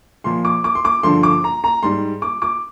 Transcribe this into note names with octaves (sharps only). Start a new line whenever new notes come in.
A#2 F3 C6
D6
D6
C6
D6
G2 D3 F3 C6
D6
A#5
A#5
G#2 G3 C6
D6
D6